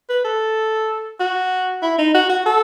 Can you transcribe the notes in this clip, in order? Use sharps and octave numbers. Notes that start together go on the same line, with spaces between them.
B4
A4
F#4
E4
D#4
F#4
F#4
A4